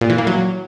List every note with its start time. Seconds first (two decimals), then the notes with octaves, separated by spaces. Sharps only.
0.01 A#2
0.10 E3
0.18 A#3
0.27 F#3